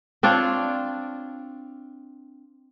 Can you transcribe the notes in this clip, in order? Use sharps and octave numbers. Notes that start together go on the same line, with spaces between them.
C4 D4 F4 C#5